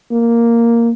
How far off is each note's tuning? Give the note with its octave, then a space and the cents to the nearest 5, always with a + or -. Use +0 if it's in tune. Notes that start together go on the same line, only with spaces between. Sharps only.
A#3 +0